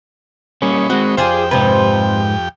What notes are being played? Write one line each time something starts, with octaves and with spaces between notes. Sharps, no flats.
G3 A#3 C#4 D#5 B5 C#6
G#3 C4 F#4
F2 F4 G4 G#4 C5 D5 G5
G#2 C3 B4 C5